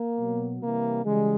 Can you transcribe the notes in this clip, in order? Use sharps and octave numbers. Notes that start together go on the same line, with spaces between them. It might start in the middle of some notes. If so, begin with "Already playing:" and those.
Already playing: A#3
B2 F#3
C3 E3 G3 A#3
C#3 E3 G3 G#3